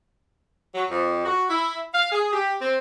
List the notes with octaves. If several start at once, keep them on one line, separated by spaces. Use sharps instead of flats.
F#3
F2
F#4
E4
F5
G#4
G4
C4